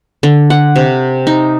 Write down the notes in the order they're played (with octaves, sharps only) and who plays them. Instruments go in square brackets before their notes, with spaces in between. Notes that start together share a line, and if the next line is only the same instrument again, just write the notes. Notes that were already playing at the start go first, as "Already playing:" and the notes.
[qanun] D3
F#5
C3
D#4